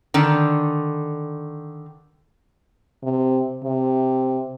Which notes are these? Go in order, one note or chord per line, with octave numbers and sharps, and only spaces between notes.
D3 D#3
C3
C3